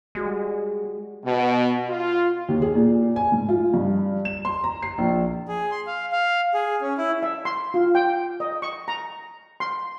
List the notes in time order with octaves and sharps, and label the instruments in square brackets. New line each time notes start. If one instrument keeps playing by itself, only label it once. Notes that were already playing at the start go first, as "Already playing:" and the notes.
[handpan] G3 F#4 G#4 [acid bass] G#3
[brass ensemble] B2
F4
[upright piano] D#2
G#4
A#2
G#5
G#2
F4
G2
E7
C6
A#5
C7
A#1
[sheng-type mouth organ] G#4
C6
F5
F5
G#4
C#4
E4
[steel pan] E5
C6
F4
G5
D#5
C#6
A#5
C6